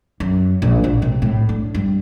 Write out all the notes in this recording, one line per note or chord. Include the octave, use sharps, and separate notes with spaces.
F#2
A#1
A1
C3
A2
D4
G2